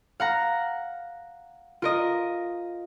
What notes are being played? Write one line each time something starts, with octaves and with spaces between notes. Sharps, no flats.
F5 F#5 A#5
F4 A#4 D#5